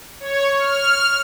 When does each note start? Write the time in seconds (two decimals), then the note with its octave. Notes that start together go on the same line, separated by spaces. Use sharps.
0.20 C#5
0.57 F6